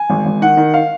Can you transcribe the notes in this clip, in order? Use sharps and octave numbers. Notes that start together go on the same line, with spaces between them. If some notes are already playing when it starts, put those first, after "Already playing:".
Already playing: G#5
G#1
G#1
D#3 F#5
D#3
F5